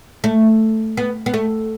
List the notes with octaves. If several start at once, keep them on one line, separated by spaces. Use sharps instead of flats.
A3
B3
B3
A3